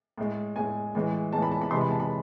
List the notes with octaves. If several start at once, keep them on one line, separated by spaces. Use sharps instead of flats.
A2 G#3
A2 G#3 G#5
A2 E3 G#3
A2 E3 G#3 A5
B5
A5
B5
C3 E3 G#3 C6
B5
A5
B5